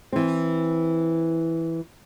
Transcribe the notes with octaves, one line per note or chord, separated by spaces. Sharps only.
E3 C4